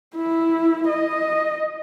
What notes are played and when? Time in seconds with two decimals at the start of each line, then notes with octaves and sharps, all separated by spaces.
0.15 E4
0.89 D#5